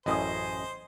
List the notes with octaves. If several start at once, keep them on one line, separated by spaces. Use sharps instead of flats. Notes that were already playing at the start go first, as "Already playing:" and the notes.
A1 F#2 A2 C5 D#5 G#5 D#6